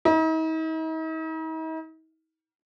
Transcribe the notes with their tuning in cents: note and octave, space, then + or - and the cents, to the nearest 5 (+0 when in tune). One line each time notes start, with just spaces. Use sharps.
D#4 +45